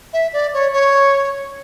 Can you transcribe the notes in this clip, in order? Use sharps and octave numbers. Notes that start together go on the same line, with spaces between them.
E5
D5
C#5
C#5